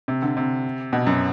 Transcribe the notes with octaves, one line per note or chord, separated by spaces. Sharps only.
C3
D3
C3
B2
F#2